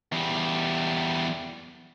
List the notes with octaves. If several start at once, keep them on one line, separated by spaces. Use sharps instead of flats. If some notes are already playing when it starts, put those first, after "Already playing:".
E2 G3